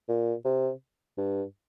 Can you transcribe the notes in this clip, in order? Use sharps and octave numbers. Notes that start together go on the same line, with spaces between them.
A#2
C3
G2